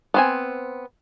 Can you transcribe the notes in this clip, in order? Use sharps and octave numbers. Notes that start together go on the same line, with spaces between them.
B3 C4 G#5